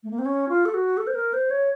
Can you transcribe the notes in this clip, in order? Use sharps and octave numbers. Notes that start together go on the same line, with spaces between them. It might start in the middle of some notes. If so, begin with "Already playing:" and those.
A3
A#3
C4
C#4
F4
A4
F#4
A4
C5
A#4
C5
C#5